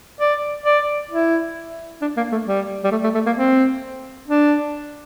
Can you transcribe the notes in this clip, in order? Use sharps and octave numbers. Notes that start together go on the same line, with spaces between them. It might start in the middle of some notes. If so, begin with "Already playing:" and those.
D5
D5
E4
D4
A#3
A3
G3
G3
A3
A3
A3
A#3
C4
D4